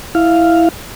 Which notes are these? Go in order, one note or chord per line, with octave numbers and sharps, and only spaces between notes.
E4 F5